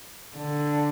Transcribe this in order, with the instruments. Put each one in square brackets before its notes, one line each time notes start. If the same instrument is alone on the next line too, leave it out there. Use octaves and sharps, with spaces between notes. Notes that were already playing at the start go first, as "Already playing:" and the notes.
[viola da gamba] D3